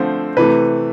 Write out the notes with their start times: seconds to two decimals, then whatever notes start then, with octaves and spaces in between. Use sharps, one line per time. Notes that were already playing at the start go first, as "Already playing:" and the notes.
Already playing: D3 F3 A3 C4 C5
0.37 C3 E3 A3 B4